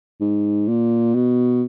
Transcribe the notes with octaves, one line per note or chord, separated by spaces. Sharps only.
G#2
A#2
B2